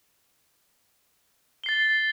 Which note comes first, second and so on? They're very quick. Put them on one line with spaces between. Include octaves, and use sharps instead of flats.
G7 C7 A6